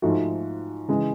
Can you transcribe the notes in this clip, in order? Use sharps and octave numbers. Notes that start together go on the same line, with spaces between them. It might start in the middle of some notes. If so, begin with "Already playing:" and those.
G#2 F3 A3 F#4
C#3 E3 G#3